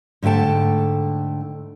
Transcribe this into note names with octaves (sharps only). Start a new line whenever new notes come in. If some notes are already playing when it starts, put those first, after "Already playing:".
G#2 D3 A3 G5 A5